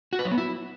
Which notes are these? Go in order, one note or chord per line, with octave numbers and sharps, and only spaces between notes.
F#4
B4
F#3
B3
E4